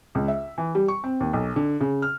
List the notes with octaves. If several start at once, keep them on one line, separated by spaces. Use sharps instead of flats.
C#2
E5
E3
G3
C#6
C4
D#2
B1
D3
C#3
F6